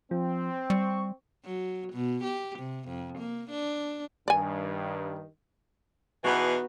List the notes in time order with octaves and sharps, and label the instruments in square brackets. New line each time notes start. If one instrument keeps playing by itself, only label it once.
[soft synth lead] F3 [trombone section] C4
[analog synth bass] G3 [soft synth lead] C#6
[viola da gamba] F#3
B2
G4
C3
F2
A#3
D4
[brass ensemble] G2 D#3 [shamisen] D5 G#5
[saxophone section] E2 B2 E3 [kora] B3 D#4 F#4